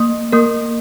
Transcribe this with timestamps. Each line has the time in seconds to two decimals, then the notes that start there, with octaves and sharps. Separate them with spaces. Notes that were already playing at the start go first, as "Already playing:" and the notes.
Already playing: A#3
0.32 A#3 A#4